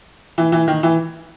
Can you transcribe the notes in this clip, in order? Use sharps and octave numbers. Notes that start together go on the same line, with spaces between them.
E3
E3
D#3
E3